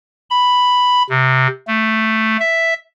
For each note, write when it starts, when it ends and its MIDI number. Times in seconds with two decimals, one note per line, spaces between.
0.30 1.03 83
1.10 1.47 48
1.67 2.37 57
2.39 2.74 76